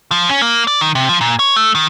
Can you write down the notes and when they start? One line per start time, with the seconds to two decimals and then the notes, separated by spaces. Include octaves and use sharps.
0.11 F3
0.29 C#4
0.42 A#3
0.67 D5
0.81 D#3
0.95 C3
1.09 F3
1.21 A#2
1.39 C#5
1.56 A3
1.75 D#3